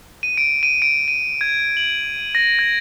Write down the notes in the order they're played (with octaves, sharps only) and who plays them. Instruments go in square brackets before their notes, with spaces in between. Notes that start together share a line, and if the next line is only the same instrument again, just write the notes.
[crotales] D#7
D7
D#7
D7
D#7
G#6
F#7
A#6
G#6